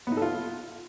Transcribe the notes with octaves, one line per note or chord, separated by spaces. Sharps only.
B3
D#4
A4
F4